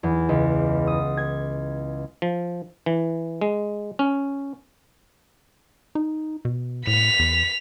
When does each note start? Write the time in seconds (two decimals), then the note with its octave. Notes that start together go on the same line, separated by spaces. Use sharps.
0.03 E2
0.29 C#2
0.87 D#6
1.17 G#6
2.22 F3
2.86 E3
3.41 G#3
3.99 C#4
5.95 D#4
6.45 B2
6.87 A2 B6 F7
7.19 E2